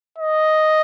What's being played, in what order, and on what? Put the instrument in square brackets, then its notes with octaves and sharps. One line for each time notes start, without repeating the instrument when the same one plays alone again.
[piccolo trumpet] D#5